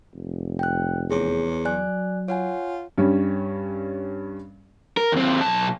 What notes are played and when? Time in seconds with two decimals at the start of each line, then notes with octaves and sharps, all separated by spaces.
0.14 F1
0.59 G5 F#6
1.11 E2 G#4 C#5
1.65 F#3 D5 G#5 F#6
2.28 F4 C#5 F#5 G#5
2.98 G2 G3 C#4
4.97 A#4
5.12 D#2 C4
5.41 B1 A5